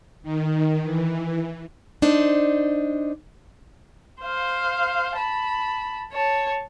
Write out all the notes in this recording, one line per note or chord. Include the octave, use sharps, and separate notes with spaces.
D#3
E3
D4 D#4 C5
C5 F5
A5 B5
C#5 A5